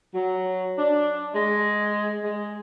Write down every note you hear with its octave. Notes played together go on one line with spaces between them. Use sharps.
F#3
D4
G#3
G#3